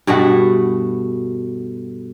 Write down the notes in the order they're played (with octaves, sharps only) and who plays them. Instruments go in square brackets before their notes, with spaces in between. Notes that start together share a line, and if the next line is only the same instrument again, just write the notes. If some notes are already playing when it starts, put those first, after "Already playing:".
[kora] G2 B2 A3 F#4